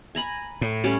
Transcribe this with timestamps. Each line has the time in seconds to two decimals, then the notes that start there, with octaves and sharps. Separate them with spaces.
0.15 G#5 A#5 B5
0.61 A2
0.84 G3 C#4